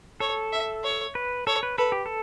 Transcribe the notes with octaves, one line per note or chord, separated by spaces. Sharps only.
A4 C#5
E5
C#5
B4
A4 C#5
B4
A4 B4
G4
A4